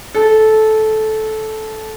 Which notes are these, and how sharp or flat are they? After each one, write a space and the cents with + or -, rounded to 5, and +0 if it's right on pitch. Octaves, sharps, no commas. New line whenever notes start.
A4 -15